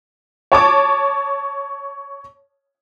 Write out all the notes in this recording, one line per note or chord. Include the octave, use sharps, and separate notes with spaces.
C#5 A5 D6